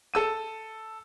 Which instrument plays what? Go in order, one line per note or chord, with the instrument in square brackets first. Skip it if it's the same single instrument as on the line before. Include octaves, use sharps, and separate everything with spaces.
[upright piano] A4 E6 D#7